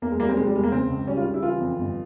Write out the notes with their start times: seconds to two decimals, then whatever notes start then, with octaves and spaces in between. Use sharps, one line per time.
0.02 E2 A#3
0.11 G#3
0.20 G3 A#3
0.29 C4
0.37 C3 G#3
0.47 G3
0.56 E2 G#3
0.63 A#3
0.72 C#3 C4
0.89 C#2
1.07 G3 C#4
1.17 F4
1.26 C#3
1.34 E4
1.42 E3 F4
1.61 F2
1.78 G1